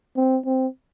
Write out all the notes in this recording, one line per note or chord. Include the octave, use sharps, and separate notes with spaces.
C4
C4